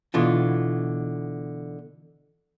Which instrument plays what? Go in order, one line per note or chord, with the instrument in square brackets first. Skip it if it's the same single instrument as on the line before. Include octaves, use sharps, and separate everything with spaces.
[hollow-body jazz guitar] B2 D3 E3 F4